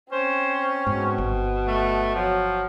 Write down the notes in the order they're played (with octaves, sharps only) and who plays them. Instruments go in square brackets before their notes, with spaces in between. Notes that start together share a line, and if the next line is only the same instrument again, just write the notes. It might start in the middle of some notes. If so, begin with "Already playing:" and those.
[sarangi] C4 [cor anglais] C#4 [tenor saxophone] C5
[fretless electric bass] G#2 [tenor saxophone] B2
[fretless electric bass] G1
[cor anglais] A3
[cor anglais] F3 [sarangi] F#3